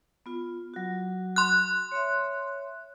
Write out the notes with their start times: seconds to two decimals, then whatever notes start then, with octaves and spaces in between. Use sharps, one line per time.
0.26 B3 F4
0.74 F#3 F#4
1.36 C6 F#6
1.92 C#5 E5